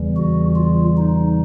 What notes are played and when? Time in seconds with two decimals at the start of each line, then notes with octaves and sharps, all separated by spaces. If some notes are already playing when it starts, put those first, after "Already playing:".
Already playing: E2 C#3 E3 G3
0.17 F#4
0.56 F4
0.97 D#4